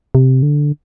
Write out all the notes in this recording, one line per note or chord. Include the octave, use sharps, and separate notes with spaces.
C3
D3